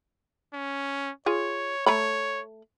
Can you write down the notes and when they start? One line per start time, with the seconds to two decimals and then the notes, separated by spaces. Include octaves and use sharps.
0.53 C#4
1.26 F4 G#4 C#5
1.86 A3 C#5 A#5 B5